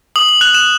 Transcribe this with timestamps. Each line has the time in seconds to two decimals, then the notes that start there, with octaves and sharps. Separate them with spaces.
0.16 D#6 F#7
0.29 F#7
0.41 F#6 F7
0.54 E7